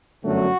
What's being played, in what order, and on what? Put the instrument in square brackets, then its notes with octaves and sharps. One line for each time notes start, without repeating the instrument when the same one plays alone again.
[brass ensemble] G1 F#2 D3 F#3 A3 F#4